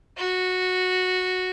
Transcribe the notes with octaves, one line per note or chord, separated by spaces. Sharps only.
F#4